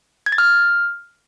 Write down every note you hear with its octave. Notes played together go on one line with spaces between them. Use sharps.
G#6
A6
F6